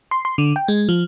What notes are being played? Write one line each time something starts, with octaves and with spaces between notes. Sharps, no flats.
C6
C6
D3
G5
G#3
F3